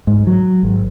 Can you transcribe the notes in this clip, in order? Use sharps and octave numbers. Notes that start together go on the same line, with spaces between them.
G#2
F#3
G#1